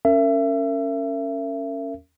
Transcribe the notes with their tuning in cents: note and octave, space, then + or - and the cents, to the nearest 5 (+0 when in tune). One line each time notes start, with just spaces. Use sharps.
C#4 +0 A#4 -30 E5 +30